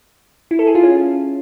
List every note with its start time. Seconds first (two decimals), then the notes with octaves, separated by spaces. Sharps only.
0.51 E4
0.59 A4
0.67 G#4
0.75 F4
0.83 C#4